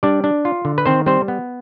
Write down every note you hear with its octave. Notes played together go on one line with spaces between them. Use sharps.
G3 D4 D5
D4
F4
D3
B4
D#3 C4 C5
G3 C4 C5
B3